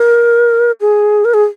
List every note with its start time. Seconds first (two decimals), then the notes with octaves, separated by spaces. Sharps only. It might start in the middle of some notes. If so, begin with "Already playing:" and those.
Already playing: A#4
0.81 G#4
1.25 A#4
1.34 G#4